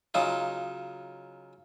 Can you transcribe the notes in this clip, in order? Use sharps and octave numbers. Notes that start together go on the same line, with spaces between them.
C#3 F#3 D#4 F4